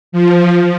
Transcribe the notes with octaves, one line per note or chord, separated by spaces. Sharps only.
F3